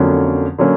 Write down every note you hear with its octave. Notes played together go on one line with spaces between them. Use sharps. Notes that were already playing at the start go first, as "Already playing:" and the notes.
Already playing: F2 D3 F#3 A#3 C#4
D3 F#3 A#3 C#4